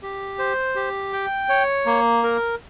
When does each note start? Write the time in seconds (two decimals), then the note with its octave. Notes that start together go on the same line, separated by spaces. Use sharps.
0.02 G4
0.39 C5
0.75 G4
1.13 G5
1.49 C#5
1.86 A#3
2.23 A#4